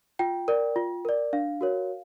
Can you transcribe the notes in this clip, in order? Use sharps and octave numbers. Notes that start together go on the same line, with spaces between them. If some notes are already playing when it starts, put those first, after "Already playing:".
F4 G5
A#4 D5
F4
A#4 D5
D4 F5
F#4 A#4 C#5